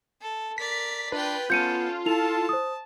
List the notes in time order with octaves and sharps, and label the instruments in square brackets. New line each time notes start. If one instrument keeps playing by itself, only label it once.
[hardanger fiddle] A4
[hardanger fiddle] A#4 D5 [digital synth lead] B6
[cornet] D4 [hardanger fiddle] F4 G5 [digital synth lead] B4
[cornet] B3 [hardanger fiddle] C#4 A4 [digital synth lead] F4 [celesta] G6 C#7 D#7
[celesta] E4 F7 [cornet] A4 [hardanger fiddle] A5
[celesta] C5 D#6